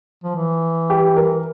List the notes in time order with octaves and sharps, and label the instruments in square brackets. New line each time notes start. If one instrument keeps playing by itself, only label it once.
[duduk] F3
E3
[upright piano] G4
A#4